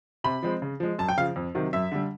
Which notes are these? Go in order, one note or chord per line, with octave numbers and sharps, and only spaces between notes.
C3 B5
F3 G#3 C4
C#3
F3 G#3
F#2 A5
G5
C#3 F3 F5
F2
C3 D#3 F#3
F#2 E5
D3 G3